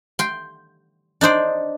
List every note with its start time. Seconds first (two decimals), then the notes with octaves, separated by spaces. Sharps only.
0.19 G5 C6
1.21 D4 D#4 C5 D5